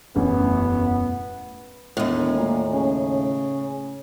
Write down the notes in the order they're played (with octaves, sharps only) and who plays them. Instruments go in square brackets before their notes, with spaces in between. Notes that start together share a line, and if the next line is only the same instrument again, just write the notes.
[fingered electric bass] E1 F#2 C#4 [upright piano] A1 [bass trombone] B3
[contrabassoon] E1 [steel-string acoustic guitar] D#2 A2
[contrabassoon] A#2
C#3